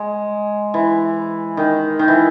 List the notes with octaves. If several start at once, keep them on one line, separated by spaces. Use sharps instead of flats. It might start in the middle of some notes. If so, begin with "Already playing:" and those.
Already playing: G#3
E3
D#3
D#3
E3